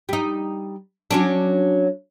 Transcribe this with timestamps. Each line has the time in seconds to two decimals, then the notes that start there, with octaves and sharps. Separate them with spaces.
0.09 G3 D#4
1.11 F#3 C#4 D4